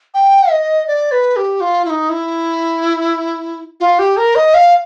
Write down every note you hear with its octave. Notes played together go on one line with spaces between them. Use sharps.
G5
D#5
D5
B4
G4
F4
E4
D#4
E4
F4
G4
A#4
D#5
F5